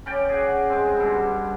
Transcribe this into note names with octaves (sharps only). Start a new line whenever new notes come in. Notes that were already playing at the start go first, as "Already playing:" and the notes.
C#4 D5 G5
F#4 G#4
G#3 C4
G2 B2